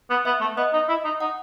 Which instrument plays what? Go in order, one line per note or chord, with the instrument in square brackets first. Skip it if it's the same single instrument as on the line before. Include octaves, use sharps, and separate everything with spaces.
[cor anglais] B3
[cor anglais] B3 [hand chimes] E5
[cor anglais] A3
[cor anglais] B3 [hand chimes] D#5
[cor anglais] D#4
E4
D#4
[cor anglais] D#4 [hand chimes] F#5